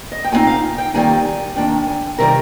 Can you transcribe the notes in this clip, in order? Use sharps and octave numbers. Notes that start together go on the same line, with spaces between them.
D#5
G5
A#2 F3 G#3 C4 D#4 G#5
F5
G5
D#3 G3 A#3 D#4 G#5
G#5
D#3 A#3 D4 G5
G#5
C3 D#3 G3 A#4